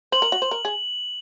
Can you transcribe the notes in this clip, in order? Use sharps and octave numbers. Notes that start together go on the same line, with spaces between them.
C5 F#7
A#4
F#4
C5
A#4
G#4